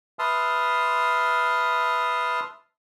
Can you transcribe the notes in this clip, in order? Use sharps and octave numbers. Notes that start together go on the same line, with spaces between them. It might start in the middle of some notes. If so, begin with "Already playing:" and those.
B4 E5 A5 C6 D#6 F6